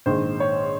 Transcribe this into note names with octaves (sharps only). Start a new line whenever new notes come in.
A#1 G#2 D#3 C5
C#5